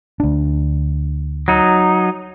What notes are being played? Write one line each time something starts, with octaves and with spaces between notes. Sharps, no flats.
D2 D4
F#3 D#4